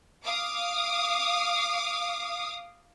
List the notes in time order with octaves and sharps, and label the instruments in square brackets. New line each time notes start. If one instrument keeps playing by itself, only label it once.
[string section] F5 D6 D#6